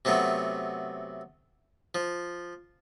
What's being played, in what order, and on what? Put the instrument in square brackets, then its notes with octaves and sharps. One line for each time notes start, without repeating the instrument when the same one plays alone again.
[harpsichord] C3 F#3 A3 B3
F3